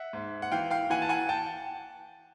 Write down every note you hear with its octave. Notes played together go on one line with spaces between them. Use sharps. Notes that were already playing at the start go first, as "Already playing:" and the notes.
Already playing: E5 F#5
G#2
F#5
E3 F5 G5
F5 G5
E3 F#5 G#5
A5
F#5 G#5
G5 A5